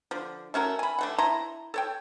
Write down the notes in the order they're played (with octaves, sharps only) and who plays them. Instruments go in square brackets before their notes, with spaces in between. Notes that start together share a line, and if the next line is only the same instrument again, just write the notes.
[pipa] D3 F3
A3 C#4 F#4 A#4
G#5 B5
D3 A3 F#5
E4 A5 A#5 C6
A4 C#5 G5